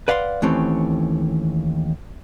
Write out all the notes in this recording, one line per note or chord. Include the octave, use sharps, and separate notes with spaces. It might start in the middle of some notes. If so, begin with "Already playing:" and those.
B4 D5 F5 F#5 C6
D#2 E3 A3 C4 C#4